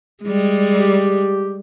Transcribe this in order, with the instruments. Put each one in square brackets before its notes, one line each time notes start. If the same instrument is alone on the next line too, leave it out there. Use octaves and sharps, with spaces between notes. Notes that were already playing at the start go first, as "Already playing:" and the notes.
[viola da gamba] G3 G#3
[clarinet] G4